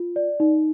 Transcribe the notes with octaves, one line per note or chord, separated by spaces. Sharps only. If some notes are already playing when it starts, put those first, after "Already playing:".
Already playing: F4
D5
D#4